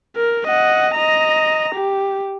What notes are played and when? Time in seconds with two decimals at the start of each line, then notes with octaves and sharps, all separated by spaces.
0.16 A#4
0.47 D#5 F#5
0.95 D#5 A#5
1.75 G4